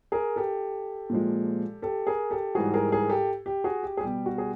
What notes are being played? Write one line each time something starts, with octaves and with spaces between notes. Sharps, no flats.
G#4 A#4
G4 A4
A#2 F3 G#3
G4 A4
G#4 A#4
G4 A4
G#2 E3 G3 F#4 G#4
G#4 A#4
G#4 A#4
G4 A4
G4
F#4 G#4
G4
G#4
B2 G3 G4
F#4
G#4